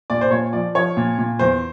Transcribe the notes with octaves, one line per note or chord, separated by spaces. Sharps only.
A#2 D5
C5
A#2 C#5
F3 D5
F3 C#5
A#2
A#2
E2 C5